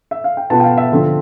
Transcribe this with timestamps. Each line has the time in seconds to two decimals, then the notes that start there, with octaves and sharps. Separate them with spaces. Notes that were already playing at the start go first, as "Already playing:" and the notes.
0.11 E5
0.24 F5
0.37 G5
0.50 B2 B3 F4 A5
0.60 G5
0.64 F5
0.77 E5
0.92 D3 F3 C4 F4